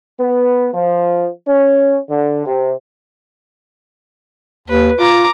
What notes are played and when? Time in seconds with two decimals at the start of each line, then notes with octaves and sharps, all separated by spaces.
0.20 B3
0.74 F3
1.48 C#4
2.10 D3
2.46 C3
4.69 D#2 B4
5.00 F4 A#5 D6